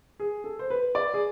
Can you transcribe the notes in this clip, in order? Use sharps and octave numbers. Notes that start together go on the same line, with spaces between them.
G#4
A4
C5
B4
D5
G#4